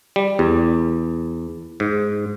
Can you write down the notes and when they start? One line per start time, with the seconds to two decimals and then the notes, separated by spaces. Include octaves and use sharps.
0.16 G3
0.39 E2
1.80 G#2